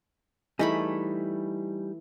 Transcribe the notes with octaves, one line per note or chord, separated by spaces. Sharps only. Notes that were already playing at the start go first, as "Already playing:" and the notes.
E3 G3 A3 D#4 G#4 B5